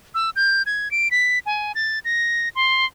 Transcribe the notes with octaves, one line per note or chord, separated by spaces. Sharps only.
E6
G6
G#6
D7
B6
G#5
A6
A#6
C6